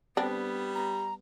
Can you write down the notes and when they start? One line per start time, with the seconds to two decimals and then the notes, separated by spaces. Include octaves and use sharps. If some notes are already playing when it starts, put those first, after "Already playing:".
0.17 D3 G3 B3 C4 D4
0.75 A#5